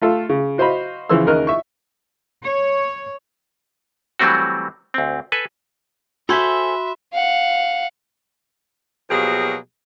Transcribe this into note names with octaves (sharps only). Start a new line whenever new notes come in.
A3 F4 A4
C#3
F#4 C5 D#5 F5 B5
C#3 E3 F3 C6 E6
D#2 C#3 A#4 D#5 F6 F#6
E5 C#6
C#5
E3 F#3 G3 A3 C4 F#4
D2 C4
A4 B4 G#5
F#4 A4 C5 E5 G#5 B5 C6 B6
F5 F#5
B2 F3 F#3 A#3 G4 G#4